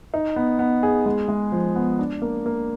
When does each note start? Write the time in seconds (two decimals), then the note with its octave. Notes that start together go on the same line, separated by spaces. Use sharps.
0.14 D#4
0.36 B3
0.59 B3
0.83 G#4
1.06 G#3
1.29 G#3
1.52 F3
1.76 B3
1.99 D4
2.22 A#3
2.46 A#3